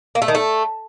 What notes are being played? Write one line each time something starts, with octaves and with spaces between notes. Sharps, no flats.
A#3
A3
D#3
A3